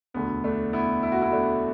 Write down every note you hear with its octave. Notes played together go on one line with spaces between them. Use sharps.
E1 D2 D3 B3
A3 D4
B3 E4
E4
F#4
B3 E4
A3 D4